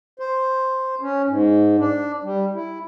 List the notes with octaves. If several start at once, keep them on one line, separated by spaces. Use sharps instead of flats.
C5
C#4
G#2
D4
G3
E4